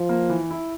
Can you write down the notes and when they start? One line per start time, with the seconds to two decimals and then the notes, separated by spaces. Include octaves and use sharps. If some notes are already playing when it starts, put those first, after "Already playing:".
Already playing: F3
0.09 A#3
0.30 E3
0.51 E4